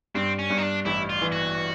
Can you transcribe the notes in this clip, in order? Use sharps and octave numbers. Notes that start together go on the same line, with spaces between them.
G2 C4
C#4
G2
D#4
D4
A1 E4
F4
E3
F#4